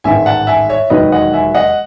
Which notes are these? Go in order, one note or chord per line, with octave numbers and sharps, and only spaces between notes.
A1 G#2 D#3 G#3 E5 G#5
F#5 A5
E5 G#5
C#5 E5
E1 D#2 D#3 F#3 B4 D#5
D#5 F#5
E5 G#5
D#5 F#5